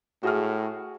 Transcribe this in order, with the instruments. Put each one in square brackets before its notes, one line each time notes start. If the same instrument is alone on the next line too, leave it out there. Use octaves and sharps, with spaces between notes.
[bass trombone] A2 [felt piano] F#4 G#4 F6